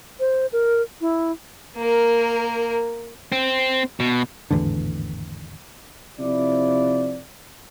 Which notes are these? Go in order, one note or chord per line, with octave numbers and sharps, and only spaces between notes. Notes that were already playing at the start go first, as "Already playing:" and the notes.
C5
A#4
E4
A#3 A#4
C4
B2
G#1 E2 A2 D3
C3 F3 E4 D5